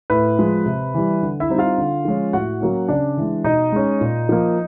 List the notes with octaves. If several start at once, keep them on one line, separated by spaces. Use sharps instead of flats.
A2 B4
F3 G#3
C3
E3 G3
D3
E4 E5
G3 C4 D#4
F4 F5
D3
F3 G#3 C#4
A2 F#4 F#5
F#3 A#3 C#4
C#3 D4 D5
E3 G#3
B2 D#4 D#5
G#3 C#4
A#2
F3 A#3